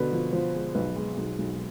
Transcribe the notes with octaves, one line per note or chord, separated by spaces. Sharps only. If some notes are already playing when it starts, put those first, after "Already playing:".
Already playing: B2 D3 B4
F3
F3 C5
G#3
B1 B4
G#3
B1
B1